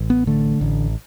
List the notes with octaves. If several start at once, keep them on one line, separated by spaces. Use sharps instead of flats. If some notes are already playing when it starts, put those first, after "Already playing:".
Already playing: A1
B3
D3 A3
A1